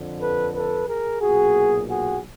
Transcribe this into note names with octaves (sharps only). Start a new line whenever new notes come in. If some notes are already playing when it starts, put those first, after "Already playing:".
Already playing: F2 D3
A4 B4
A4 B4
G#4 A#4
B1 A#2 F#4 G#4
F#4 G#4